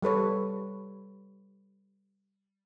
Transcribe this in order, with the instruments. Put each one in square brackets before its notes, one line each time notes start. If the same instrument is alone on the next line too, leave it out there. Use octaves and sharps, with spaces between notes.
[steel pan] G3 A4 B4 C#5